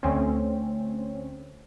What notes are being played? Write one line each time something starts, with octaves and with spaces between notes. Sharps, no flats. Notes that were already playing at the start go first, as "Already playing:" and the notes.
D2 C4 C#4